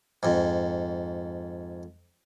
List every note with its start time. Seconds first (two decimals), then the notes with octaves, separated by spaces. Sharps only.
0.23 F2 G#2